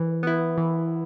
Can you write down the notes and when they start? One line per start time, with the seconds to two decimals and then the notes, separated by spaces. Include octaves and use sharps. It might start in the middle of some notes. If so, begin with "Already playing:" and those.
Already playing: E3
0.23 B3 E4
0.58 E3